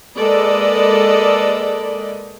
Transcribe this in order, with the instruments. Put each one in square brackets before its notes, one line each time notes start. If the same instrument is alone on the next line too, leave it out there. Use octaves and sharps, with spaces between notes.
[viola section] G#3 A#3 A4 B4 D5 D#5